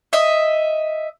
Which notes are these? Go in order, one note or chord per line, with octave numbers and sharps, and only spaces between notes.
D#5 E5